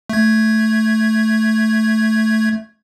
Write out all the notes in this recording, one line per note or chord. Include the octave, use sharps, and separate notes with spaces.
A3 G#6